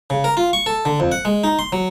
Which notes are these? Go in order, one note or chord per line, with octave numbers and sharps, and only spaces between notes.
C#3
A#4
F4
C#6
A4
D3
F2
F#5
G#3
D#4
C6
F#3